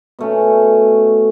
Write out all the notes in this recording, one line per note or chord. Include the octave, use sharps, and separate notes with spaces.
B2 A3 C#4